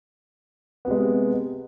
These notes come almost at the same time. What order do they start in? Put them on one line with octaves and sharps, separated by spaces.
B3 C3 G#3